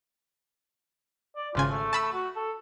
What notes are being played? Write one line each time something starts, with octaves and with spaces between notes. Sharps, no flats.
D5
G#1 C#3 F4 G#5
A3
A5 B5 E6
F#4
A4